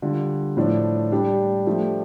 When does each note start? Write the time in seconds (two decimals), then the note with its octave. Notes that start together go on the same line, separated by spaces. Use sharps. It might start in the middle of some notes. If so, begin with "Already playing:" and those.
0.02 D3 G3 F4
0.57 A2 F3 D4
1.11 G3 D4 G4
1.67 F3 A3 D4 G4